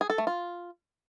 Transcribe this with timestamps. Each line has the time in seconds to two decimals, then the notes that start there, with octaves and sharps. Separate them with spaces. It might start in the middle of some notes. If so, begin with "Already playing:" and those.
0.01 G#4
0.10 A4
0.18 A3
0.27 F4